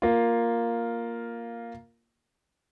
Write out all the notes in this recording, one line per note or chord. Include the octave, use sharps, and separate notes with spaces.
A#3 F4